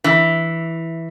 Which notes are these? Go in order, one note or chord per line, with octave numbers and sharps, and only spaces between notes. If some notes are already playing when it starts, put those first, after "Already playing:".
E3